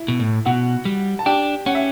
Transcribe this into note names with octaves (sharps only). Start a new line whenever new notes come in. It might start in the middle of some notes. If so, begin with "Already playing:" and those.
Already playing: E4
B2
A2
B2 F#4 F#5
G3
A5
D4 G4 G5
C#4 F#5
E5